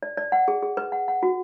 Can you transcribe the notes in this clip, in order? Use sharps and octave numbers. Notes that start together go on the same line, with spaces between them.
D5
D5
F#5
G#4
G#4
B4
F#5
F#5
F#4